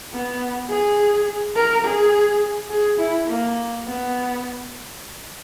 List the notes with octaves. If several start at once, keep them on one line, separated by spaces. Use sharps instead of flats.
B3
G#4
A#4
G#4
G#4
E4
A#3
B3